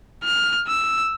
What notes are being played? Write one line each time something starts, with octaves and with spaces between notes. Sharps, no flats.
F6
E6